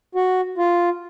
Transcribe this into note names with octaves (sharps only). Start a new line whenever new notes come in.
F#4
F4